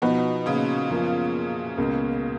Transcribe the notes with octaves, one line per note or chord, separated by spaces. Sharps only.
B2 F3 B3 D#4 F#4 B4
A#2 C#3
F#2 F3 A#3 F4
C#2 B2 A#3